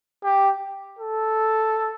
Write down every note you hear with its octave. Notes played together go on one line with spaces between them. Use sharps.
G4
A4